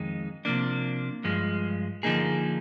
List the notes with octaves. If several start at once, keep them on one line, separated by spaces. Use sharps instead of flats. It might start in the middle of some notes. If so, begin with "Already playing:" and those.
Already playing: F2 D#3 G#3 D#4
C3 F3 A#3 D4
G2 F3 G#3
D3 F3 A#3 D#4 G#4